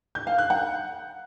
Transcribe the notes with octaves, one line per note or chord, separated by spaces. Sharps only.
G6
F5
F#6
F#5